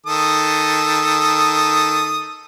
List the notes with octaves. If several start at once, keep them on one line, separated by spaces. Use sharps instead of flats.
D#3 A4 D#6